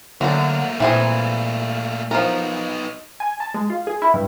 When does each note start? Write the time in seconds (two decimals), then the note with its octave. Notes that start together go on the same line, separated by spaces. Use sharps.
0.21 D3 F#3 A3 A#3 D4
0.80 A#2 E3 C4 G#4
2.11 F3 B3 D#4 A#4
3.20 G#5
3.40 A5
3.54 G#3
3.70 F4
3.87 G#4
4.02 E4
4.14 G2